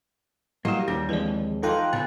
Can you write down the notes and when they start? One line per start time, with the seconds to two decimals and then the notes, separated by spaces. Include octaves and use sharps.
0.65 F#3 G3 A#3 E4 G4 D#5
0.88 D#2 G3 D4
1.09 F2 E3 G#3 B4 D5
1.63 E3 D#4 F4 A4 G5 F#6
1.93 C#3 B3